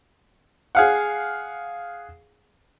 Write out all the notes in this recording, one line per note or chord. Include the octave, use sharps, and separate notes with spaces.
G#4 F5 F#5